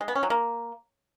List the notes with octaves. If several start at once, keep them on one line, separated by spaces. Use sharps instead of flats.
G#3
B3
C#4
F#3
A#3